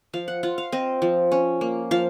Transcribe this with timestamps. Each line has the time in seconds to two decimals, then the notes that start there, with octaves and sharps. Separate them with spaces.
0.13 F3 F5
0.28 F#5
0.43 F4 F#5
0.58 F5
0.72 C4 D#5
1.02 F3
1.32 C#4
1.61 A#3
1.91 F3 F5